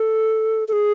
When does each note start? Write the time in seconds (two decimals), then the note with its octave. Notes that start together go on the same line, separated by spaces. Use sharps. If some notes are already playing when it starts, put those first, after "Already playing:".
Already playing: A4
0.68 A4
0.73 G#4